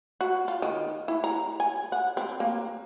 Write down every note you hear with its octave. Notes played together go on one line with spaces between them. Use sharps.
F#4
F4
D#3
E4
A#5
G#5
F#5
C4
A#3